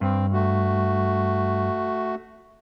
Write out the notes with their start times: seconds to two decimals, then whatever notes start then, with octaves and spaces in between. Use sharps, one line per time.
0.01 G2 C4
0.33 A3 F#4